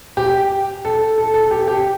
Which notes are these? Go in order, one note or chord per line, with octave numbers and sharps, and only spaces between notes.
G4
A4
A4
A4
G4
G4